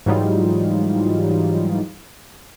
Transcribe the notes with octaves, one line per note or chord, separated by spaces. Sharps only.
G#2 E3 F#3 G3 D#4 F4